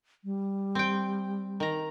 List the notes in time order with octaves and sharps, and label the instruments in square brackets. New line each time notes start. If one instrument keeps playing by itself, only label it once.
[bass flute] G3
[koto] C4 G5
D#3 A#5